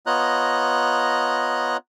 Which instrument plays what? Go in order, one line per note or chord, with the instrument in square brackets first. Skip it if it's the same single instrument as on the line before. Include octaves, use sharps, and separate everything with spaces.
[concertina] B3 F4 C#5 D#5 A#5 F#6